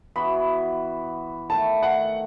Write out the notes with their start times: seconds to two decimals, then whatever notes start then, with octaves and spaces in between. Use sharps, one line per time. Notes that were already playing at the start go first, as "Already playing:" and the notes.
0.16 E3 B3 F#4 B5
1.49 D#3 A3 E4 A5
1.83 F#5